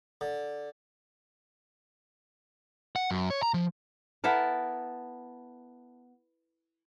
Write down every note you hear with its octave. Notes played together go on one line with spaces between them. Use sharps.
D3
F#5
F#2
C#5
A#5
F3
B3 E4 A4 A#4